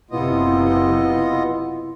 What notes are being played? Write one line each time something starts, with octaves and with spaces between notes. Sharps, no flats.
F#1 C3 B3 E4 F4 D#5